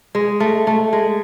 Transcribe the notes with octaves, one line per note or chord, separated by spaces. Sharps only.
G#3
A3
A3
G#3